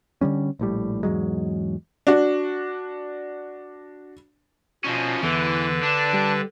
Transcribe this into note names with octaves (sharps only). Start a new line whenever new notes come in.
D3 E3 G3 C#4
A#1 A2 G3
E2 G#2 F#3 G#3
D4 F#4
B2 F3 C#4
E2 D3 E3 B4
D4
G3